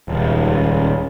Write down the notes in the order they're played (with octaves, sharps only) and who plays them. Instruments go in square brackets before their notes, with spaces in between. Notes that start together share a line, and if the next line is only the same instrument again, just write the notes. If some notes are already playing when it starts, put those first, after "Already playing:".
[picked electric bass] D#1 [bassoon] C#2